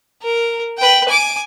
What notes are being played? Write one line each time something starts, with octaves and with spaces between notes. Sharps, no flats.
A#4
B4 G5
G#5 D6